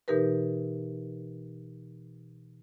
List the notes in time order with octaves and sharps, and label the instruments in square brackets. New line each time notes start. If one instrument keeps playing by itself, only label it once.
[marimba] B2 E3 D#4 G4 A#4 B4